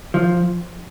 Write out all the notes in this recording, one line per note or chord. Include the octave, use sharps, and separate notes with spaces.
F3